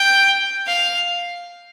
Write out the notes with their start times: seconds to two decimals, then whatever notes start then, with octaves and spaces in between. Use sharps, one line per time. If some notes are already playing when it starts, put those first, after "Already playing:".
Already playing: G5
0.68 F5